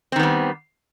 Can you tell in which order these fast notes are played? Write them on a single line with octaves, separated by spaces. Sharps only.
C4 D#3 B3 G3